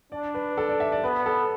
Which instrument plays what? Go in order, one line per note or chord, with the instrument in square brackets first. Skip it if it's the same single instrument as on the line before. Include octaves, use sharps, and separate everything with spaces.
[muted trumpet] D4 [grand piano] D5
[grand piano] B4
A4
D5
E5
D5
[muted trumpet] B3 [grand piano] B4
[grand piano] A4